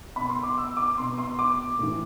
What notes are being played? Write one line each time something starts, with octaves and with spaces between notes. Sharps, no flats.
B2 B5
C6
D6
E6
D6
B2 C6
C6
D6
A2 E3